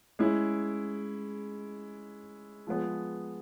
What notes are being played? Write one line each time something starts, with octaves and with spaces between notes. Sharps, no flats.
G#3 C#4 E4
F3 G#3 B3